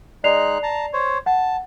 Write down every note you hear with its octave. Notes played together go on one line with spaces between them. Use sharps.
G#3 D#4 D5 F#6 C7 F7
A5 A#5
C5 C#5
F#5 A5